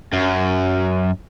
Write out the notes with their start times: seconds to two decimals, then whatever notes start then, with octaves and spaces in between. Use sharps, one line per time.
0.13 F#2